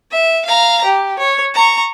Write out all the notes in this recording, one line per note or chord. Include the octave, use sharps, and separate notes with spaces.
E5
F5 A#5
G4
C#5
A#5 C#6